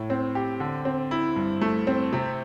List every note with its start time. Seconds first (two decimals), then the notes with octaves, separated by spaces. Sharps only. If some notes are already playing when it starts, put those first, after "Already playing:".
Already playing: A2
0.10 C4
0.35 G4
0.60 D3
0.85 C4
1.11 E4
1.36 G2
1.61 A3
1.87 C4
2.13 C3